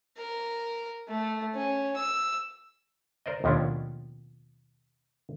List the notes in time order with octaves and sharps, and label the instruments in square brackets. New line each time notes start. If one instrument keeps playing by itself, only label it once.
[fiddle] A#4
A3
C#4
E6
[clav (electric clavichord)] A#4 C5 D5 D#5
D#2 B2 F3 A3 C#4 D4